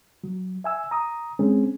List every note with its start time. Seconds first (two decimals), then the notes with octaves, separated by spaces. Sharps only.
0.24 F#3
0.64 E5 G#5 E6
0.91 A#5 D#6
1.39 G#3 C4 C#4 G#4